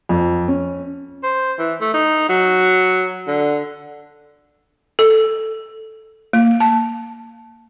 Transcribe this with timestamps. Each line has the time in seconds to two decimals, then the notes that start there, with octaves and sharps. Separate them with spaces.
0.09 F2
0.48 C#4
1.23 C5
1.59 E3
1.81 A3
1.94 D#4
2.29 F#3
3.27 D3
4.99 A4
6.33 A#3
6.60 A5